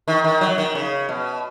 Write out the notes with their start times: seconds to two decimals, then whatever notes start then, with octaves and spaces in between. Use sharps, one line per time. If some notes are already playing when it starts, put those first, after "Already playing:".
0.08 D#3
0.24 D#3
0.41 F#3
0.58 D#3
0.75 C#3
1.09 B2